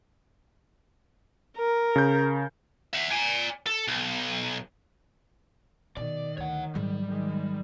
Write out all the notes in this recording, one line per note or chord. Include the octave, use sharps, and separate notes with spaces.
A#4
C#3 G6
E5 F#5
D5 G#5
A4
B1
B2 D#3 D5
D2 C#5 F#5
G#2 F#3 G3
D#3 G#3